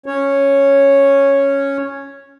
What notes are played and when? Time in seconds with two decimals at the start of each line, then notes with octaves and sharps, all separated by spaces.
0.06 C#4 C#5